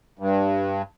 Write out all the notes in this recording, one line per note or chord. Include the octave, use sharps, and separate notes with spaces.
G2